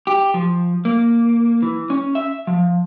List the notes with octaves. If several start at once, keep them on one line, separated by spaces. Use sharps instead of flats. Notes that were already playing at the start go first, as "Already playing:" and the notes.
G4
F3
A#3
E3
C#4
E5
F3